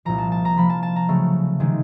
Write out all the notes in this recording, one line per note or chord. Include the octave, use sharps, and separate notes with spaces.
C2 A#2 F3 A#5
A5
A5
A#5
C3 F3 A#3 B5
A5
A5
A#5
C#3 F#3 A3
C3 D#3 G#3